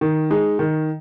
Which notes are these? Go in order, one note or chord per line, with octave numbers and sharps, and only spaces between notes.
D#3
G#3 D#4
D#3